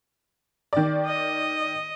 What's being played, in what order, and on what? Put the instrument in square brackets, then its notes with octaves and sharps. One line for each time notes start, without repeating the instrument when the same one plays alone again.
[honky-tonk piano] D#3 D5
[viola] D#5